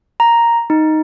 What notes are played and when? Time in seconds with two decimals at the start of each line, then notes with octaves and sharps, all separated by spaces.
0.20 A#5
0.70 D#4